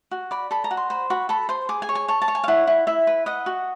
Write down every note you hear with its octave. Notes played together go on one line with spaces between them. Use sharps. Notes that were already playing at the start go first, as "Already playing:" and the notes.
F#4
D5 B5
A4 B5
A#5
F#4
C6
C5 B5
F#4 B5
A4 B5
C5 C6
G#4 D6
G#5
C#5
G#5
C#5 A5
A5
C#5
G#5
F5
E4 F#5
E4
E4 E5
B4
D#5 F#5
F#4